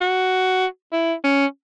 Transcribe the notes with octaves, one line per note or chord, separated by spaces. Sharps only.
F#4
E4
C#4